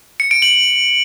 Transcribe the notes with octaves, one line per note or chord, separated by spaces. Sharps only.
C#7
D7
F#7